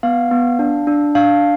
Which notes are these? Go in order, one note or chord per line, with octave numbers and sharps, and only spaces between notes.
B3 F5
B3
D4
D4
D4 F5